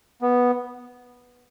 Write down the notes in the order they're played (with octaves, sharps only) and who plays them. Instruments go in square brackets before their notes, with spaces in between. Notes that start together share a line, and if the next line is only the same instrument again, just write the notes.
[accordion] B3